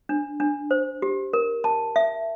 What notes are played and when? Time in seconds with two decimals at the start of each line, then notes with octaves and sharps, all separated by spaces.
0.09 D4
0.40 D4
0.71 C5
1.02 G4
1.33 A#4
1.64 A5
1.96 E5